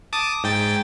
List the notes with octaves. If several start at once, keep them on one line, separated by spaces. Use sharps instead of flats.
A5 D6 D#6
G#2 G5 A6